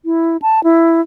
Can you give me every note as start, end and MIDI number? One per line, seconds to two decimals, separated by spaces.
0.05 0.37 64
0.42 0.63 81
0.64 1.01 64